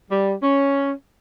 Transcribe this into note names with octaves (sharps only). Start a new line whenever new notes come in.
G3
C#4